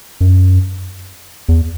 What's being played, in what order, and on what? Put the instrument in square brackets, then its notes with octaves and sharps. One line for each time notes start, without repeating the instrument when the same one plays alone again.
[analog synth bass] F#2
E2